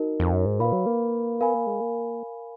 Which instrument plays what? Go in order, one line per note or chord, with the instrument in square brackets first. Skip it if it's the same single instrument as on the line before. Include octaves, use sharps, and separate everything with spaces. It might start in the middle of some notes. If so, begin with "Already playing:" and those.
Already playing: [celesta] D#4 F#4 A#4 D#5
[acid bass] F2
F#2
G#2
[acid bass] A#2 [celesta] B4 F5 B5
[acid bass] F#3
A#3
[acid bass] B3 [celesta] A#4 F5 G#5 B5
[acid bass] A#3
G#3
A#3